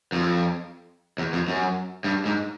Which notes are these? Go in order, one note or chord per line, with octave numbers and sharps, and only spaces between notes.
F2
E2
F2
F#2
G2
G#2